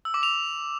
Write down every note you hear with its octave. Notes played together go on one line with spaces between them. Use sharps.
E6
D6
F7